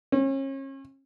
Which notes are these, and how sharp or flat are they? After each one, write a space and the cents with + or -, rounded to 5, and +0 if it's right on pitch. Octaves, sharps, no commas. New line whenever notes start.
C#4 -35